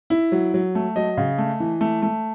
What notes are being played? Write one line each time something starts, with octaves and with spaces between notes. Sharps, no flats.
E4
F#3
F#3
A3
F#3 D#5
C#3
A3
E3
A3
A3